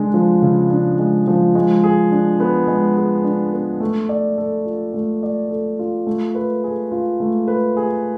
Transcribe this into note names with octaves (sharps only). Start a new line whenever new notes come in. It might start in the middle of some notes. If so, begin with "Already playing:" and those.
Already playing: C#3 G#3 D4
F3
C#3
D4
G#3
F3
G#3
G#4
D4
B3
G#3
G#4
D4
B3
A3
D5
A4
F4
A3
D5
A4
F4
A3
B4
G#4
F4
A3
B4
G#4